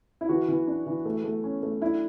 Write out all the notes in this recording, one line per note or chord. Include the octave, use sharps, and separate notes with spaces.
E4
E3 F#4
E3
D4
E3
A3
A3
C#4
A3
D4 E4